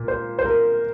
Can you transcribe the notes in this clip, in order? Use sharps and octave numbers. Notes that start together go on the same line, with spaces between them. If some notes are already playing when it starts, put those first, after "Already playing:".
Already playing: A#2
C5
C5
A#4